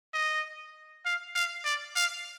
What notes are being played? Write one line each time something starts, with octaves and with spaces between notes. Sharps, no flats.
D#5
F5
F5
D5
F5